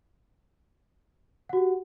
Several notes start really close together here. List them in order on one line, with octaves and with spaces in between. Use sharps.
F#5 F#4 G4